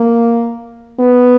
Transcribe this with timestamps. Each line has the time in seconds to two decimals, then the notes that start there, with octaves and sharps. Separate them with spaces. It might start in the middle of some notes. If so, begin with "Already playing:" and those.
Already playing: A#3
0.99 B3